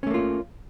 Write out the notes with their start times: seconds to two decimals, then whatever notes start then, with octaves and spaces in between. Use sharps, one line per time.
0.03 C#4
0.07 A3
0.10 A#3
0.14 F4